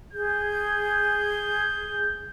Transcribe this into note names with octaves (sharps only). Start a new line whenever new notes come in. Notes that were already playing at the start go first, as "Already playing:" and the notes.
G#4 G6